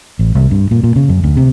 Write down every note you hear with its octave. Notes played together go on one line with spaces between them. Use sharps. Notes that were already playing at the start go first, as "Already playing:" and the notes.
A1
C2
G2
A#2
A#2
C#3
F#2
D2
C3